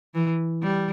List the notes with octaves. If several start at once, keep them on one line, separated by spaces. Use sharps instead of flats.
E3
G3